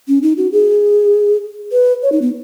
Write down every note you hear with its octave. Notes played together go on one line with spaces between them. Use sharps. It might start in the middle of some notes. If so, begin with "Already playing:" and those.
C#4
D#4
F#4
G#4
B4
C#5
D#4
B3